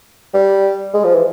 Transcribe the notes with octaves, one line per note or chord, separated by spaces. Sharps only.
G3
G#3
F3
E3